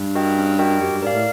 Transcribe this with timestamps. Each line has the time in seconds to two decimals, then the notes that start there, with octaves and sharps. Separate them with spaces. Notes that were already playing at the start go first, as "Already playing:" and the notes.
Already playing: G2
0.15 F#4 A#4 D#5 G5
0.37 C#4
0.59 F#4 A#4 D#5 G5
0.81 F#2 G4
0.91 G2
1.02 G#2 A#4 D5 F5
1.13 A2